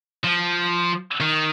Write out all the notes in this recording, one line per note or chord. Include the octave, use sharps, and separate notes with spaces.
F3
D#3